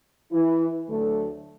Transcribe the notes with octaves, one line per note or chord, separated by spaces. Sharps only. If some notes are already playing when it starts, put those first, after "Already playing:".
E3 E4
D2 D3 F#3 A3